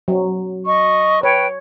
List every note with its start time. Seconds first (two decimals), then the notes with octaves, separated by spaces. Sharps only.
0.08 F#3
0.66 D#5 C#6
1.23 B4 C#5 G5